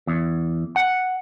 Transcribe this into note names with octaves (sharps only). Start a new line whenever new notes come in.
E2
F#5